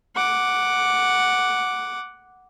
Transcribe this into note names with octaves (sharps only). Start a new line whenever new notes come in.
F#5 D6